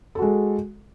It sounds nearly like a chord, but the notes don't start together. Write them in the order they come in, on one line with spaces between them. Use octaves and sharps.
A4 F#4 G#3